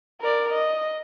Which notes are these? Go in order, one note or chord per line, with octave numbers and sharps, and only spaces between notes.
A#4 D5
D#5